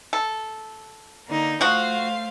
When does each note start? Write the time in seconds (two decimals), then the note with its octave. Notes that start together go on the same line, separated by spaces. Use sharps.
0.13 A4
1.27 D3 A#3 D#4
1.61 F3 A3 F#4 C5 F5